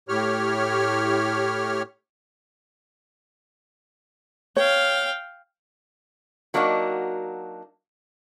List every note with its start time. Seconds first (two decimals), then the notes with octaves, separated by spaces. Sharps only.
0.09 A2 G4 C#5 F6
4.56 C#5 F5 G5
6.54 F#3 A#3 D4 D#4 F4 F#4